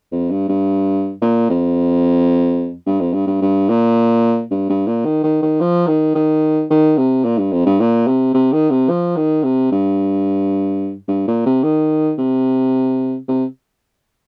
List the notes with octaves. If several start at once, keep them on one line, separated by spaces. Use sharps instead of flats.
F2
G2
G2
A#2
F2
G2
F2
G2
G2
G2
A#2
G2
G2
A#2
D#3
D#3
D#3
F3
D#3
D#3
D#3
C3
A#2
G2
F2
G2
A#2
C3
C3
D#3
C3
F3
D#3
C3
G2
G2
A#2
C3
D#3
C3
C3